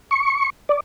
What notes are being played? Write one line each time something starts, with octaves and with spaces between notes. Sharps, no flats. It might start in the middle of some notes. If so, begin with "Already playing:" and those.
C#6
D5